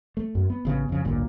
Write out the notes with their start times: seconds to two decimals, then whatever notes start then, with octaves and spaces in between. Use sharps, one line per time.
0.17 A3
0.35 F#2
0.50 B3
0.65 A1 C#3 B3
0.89 F2 C#3
1.05 A1 D2 G2 A#2